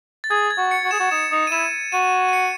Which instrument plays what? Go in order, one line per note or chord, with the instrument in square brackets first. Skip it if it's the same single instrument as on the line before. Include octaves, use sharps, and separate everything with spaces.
[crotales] A6
[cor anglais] G#4 [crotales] G#6
[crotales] G#6
[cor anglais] F#4
[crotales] C#7
[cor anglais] F#4
[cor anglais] G#4 [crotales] E7
[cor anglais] F#4
[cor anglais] D#4 [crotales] E7
[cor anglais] D#4
[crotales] D#7
[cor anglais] E4 [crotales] E7
[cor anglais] F#4 [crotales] D#7
[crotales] D#7
C#7